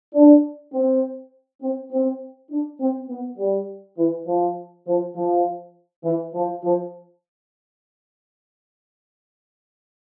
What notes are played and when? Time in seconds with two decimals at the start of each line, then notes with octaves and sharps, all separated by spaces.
0.14 D4
0.73 C4
1.61 C4
1.91 C4
2.50 D4
2.80 C4
3.09 B3
3.38 G3
3.98 E3
4.27 F3
4.86 F3
5.16 F3
6.04 E3
6.33 F3
6.63 F3